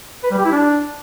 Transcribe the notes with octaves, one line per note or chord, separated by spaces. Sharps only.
B4
G3
G4
E4
D4